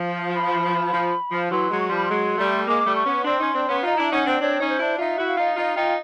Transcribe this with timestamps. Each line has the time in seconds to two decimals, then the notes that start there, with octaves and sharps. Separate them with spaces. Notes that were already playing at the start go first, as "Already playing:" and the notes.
Already playing: F3
0.36 B5
0.93 F3
1.32 F3
1.51 E3 F#3 C6
1.70 F#3 G#3
1.80 C#6
1.88 F3 G3 C6
1.97 B5
2.05 F#3 G#3 C6
2.38 G3 A3
2.67 G#3 A#3 D6
2.86 G3 A3
2.96 C#6
3.06 B3 C#4
3.24 C4 D4 C6
3.39 C#4 D#4
3.53 C4 D4
3.68 B3 C#4
3.83 D#4 F4 A#5
3.97 D4 E4
4.12 C#4 D#4 F#5
4.26 C4 D4
4.41 C4 D4 C#5
4.60 C#4 D#4
4.69 C5
4.79 D4 E4
4.98 D#4 F4 E5
5.18 E4 F#4
5.27 F5
5.37 D#4 F4
5.56 D#4 F4
5.76 D#4 F4 G5